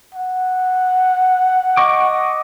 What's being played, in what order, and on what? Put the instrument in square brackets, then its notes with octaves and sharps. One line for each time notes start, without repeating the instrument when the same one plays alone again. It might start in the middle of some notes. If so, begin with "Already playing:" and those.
[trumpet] F#5
[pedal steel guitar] D#5 C#6 D6